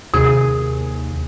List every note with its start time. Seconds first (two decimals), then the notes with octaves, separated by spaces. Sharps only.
0.14 D#2 C3 G#4